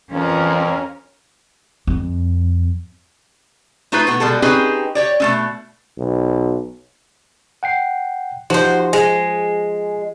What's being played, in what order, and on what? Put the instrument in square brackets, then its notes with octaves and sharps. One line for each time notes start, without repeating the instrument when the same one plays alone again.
[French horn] F2 [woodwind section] E3 [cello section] C#4 [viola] F4 A#4
[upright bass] F2
[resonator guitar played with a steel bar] A3 D#4 F4 B4 C5
B2 A3 B3
B2 G3 G#3 A4
C4 C#4 D#4 G4 G#4 B4
G4 C#5 D5
B2 A3 C#4
[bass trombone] B1
[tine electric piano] F#5 G5 C7
[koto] F3 [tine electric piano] D#4 G4 C6 [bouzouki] F#4 C5
[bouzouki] G#3 [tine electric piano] G#5